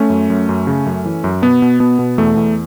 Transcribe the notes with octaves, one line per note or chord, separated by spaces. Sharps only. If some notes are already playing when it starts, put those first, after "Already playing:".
Already playing: A3 C#4
F#2
F#2
F#2
C#3
F#2
E3
F#2
B2 B3
B2
B2 B3
B2
E2 A3
E2